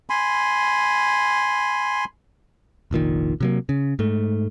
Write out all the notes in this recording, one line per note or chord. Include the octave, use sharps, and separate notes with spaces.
G#5 B5 C6
F1 A#1 A#2 D#3
C3 F#3 A#3
C#3
G#2 A3